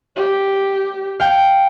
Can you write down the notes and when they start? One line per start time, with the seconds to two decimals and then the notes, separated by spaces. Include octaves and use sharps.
0.16 G4
1.20 F5 G5